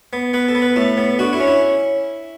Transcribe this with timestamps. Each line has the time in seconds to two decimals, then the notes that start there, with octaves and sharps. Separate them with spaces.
0.13 B3
0.33 B3 B4
0.49 A4
0.55 B3
0.62 B4
0.76 A2 A4
0.97 B3
1.19 D3 F#4
1.33 E4
1.40 C#4
1.47 E4